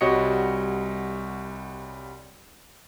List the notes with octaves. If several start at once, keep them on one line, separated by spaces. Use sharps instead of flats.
C2 G3 F#4 C#5 D#5 C#7